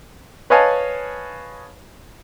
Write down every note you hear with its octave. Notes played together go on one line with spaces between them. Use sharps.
B4 C#5 D#5 F5 G#5 A5